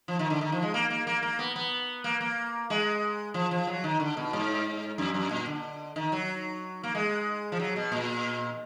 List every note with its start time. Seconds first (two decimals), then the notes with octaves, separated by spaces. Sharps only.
0.08 F3
0.19 D#3
0.30 D3
0.41 D#3
0.52 F3
0.62 G#3
0.74 A#3
0.90 A#3
1.07 A#3
1.22 A#3
1.39 B3
1.56 B3
2.04 A#3
2.21 A#3
2.70 G#3
3.34 F3
3.51 F3
3.67 F#3
3.84 D#3
4.00 D3
4.17 B2
4.33 G#2
4.98 F#2
5.14 F#2
5.31 A#2
5.47 D3
5.96 D#3
6.12 F#3
6.83 A#3
6.95 G#3
7.52 F3
7.59 F#3
7.76 B2
7.92 A#2